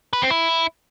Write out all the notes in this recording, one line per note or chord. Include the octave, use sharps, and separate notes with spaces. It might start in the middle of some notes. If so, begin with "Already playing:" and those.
B4
C4
E4